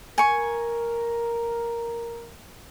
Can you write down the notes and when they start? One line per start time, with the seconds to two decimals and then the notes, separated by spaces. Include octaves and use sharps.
0.18 A#4 G#5 C#6